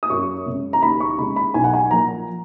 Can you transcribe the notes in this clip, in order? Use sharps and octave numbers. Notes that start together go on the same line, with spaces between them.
D#6
F#2 C#6
C#3 G#3
A#5
D#2 B5
C#6
C#3 G#3 B5
B5
B1 G#5
F#5
G#5
A#2 F3 A#5